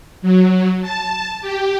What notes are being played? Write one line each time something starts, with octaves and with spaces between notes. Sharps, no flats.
F#3
A5
G4